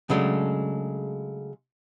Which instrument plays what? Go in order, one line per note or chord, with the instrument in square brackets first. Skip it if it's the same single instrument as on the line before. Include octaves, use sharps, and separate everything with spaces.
[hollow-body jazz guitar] C#3 F#3 G#3 A3 D4